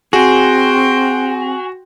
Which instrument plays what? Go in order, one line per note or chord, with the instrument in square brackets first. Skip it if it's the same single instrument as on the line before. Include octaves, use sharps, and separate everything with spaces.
[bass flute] C4 [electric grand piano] F#4 [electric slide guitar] G#4 [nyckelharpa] G5 C6